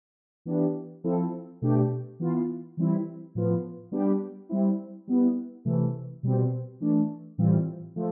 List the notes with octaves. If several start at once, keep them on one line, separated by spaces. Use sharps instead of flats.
E3 B3 D4 G4
F3 C4 E4 A4
B2 A3 D4 G4
E3 B3 F4
E3 G3 C4 E4
A2 F3 B3 F4
G3 B3 D4 G4
G3 C4 E4
G3 B3 E4
C3 E3 A3
B2 G3 C4
E3 A3 D4
A2 E3 G3 C4 F4
F3 A3